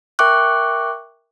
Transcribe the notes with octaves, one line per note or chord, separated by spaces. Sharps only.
A#4 E5 G5 C#6 D6 F#6